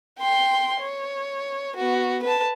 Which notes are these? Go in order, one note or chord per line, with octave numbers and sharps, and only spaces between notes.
G5 C6
C#5
B3 F#4
B4 A5